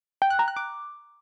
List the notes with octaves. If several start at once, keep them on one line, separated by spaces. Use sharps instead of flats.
G5
F#6
A#5
F#6
D6